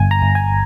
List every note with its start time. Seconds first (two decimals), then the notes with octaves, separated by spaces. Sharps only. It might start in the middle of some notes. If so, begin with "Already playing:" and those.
Already playing: G1 G#5
0.11 A#5
0.22 G1
0.35 G#5